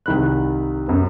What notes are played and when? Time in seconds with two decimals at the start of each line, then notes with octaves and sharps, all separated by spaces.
0.06 C2 D#3 B5 F#6
0.88 F#2 B3